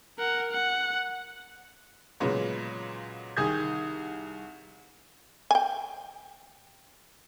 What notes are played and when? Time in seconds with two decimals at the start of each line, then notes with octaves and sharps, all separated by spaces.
0.18 A#4 F#5
0.51 F#5
2.20 A#2 C#3 F#3 G#3 B3
3.37 C2 D#3 G#4 D#6 G6 G#6
5.51 G5 G#5